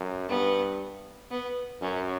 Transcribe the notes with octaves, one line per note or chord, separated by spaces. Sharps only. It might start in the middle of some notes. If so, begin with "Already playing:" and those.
Already playing: F#2
G2 B3
B3
F#2 C#4